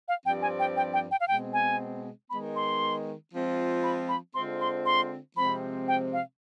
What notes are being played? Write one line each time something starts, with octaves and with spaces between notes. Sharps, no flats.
F5
G2 F3 C4 G4 D5 G5
G#5
G5
G5
G5
G5
F5
B2 G#3 C4 G5
G#5
D#3 G#3 B3 B5
C6
F3 G#3 C4 F4
B5
B5
D3 G#3 C4 F4 C5 C6
C6
C6
C3 F3 G#3 C4 B5
G5
F5